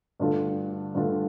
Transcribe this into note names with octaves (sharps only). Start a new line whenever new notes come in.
G2 D3 A3 D4 F4
G2 D3 A3 D4 F4